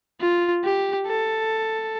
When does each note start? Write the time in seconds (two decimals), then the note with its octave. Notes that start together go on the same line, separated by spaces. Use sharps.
0.20 F4
0.64 G4
1.06 A4